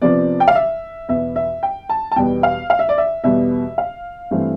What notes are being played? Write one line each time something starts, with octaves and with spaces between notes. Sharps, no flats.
C3 F3 B3 D5
G5
F5
E5
E2 B2 B3 E5
E5
G5
A5
A5
E2 B2 G3 B3 G5
F5
F5
E5
D5
E5
E2 B2 G3 B3 E5
F5
G2 E3 A3 C4